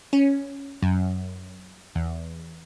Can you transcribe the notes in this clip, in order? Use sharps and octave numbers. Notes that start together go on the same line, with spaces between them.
C#4
F#2
E2